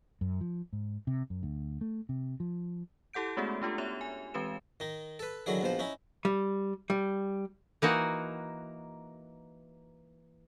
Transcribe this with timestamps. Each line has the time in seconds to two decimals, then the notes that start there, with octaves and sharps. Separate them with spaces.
0.21 F#2
0.41 F3
0.73 G#2
1.07 C3
1.30 F#2
1.43 D2
1.81 A3
2.09 C3
2.40 F3
3.13 E4 G4 A4 F#5 G6 D7
3.37 G#3 A3 B3 C#4 F#4 G#4
3.62 A3 D4 F4 G4 A4
3.78 B3 G4 C#5 E5 F7
4.01 G#5
4.34 E3 G#3 C4 G4 B4 E7
4.80 D#3 D#4
5.19 A4 B4
5.46 D3 D#3 F#3 E4 G#4
5.61 A#1 B2 F3 C5
5.79 C#4 D#4 E4
6.25 G3
6.90 G3
7.82 E3 A#3 D#4 F#4